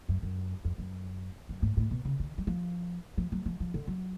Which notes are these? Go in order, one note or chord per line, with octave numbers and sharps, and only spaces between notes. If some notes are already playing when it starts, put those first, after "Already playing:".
F#2
F#2
F2
F#2
F#2
G#2
A2
B2
C#3
D3
F#3
F3
F3
F#3
F3
F3
D3
F#3